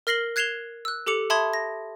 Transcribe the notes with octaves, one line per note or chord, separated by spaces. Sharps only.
A#4 F6 A#6 C7 F#7 G7
F#6 G#6 C7 E7 F7 G7
E6 F#6
G4 A4 D6 C#7 F7
E5 A5 B5 C6 D#6 G#6
A#6